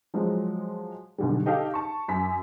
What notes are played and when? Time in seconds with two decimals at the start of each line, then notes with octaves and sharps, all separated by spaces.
0.14 F3 F#3 G#3
1.18 B1 D3 G3
1.46 D#4 G4 A4 F5
1.74 A5 C#6
2.08 F#2 B6